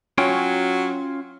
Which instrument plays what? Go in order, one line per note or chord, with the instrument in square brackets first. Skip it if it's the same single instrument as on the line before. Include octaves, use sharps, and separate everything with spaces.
[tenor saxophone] F#3 [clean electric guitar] C#4 F4 G5